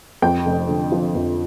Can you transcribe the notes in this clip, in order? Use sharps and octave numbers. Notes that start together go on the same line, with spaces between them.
F2 G5
F1
D3
F3
F2